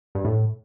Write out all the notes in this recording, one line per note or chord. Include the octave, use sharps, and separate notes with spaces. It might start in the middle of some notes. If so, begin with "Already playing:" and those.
G2
A2